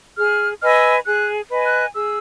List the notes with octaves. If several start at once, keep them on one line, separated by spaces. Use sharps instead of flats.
G#4 F6
B4 D#5 G#5 E6 F6
G#4 F#6
B4 D#5 G#5
F#6
G#4 E6